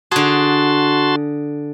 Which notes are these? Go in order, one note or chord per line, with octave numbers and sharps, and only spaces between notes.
D3 F#4 G#4 A5 C6